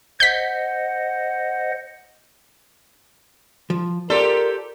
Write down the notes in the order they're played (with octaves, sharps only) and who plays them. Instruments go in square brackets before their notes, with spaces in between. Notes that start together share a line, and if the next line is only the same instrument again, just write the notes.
[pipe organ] C5 D#5 F#5 [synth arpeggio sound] G6 B6
[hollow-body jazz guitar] F3
[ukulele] F4 D5 [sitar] G4 A4 [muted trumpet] A#4 [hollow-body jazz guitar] C5